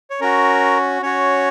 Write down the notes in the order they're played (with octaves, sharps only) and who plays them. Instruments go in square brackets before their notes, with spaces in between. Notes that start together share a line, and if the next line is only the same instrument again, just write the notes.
[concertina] C#5
C#4 F#4 A#4
C#4 F#4 C#5